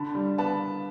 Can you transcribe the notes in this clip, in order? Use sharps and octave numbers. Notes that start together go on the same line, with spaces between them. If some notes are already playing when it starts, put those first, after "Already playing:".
Already playing: D3 A5 B5
G3
B3 A5 B5